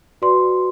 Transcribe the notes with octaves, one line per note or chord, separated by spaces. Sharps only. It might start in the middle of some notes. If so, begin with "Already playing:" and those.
F#4 B4 D5 C6